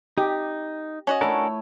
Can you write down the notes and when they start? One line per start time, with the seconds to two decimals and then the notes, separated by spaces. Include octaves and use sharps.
0.18 D#4 G4
1.07 C#4 F#4 D#5
1.21 A3 D4 E4 A4 A#4 C#5